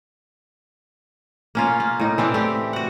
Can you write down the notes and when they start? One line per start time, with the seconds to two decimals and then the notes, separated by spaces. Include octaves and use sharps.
1.55 A#3 C#4 F4
1.80 A#3
2.00 A2 D#4
2.18 E3 C4 D4
2.34 A3 G4
2.73 F#4 F#5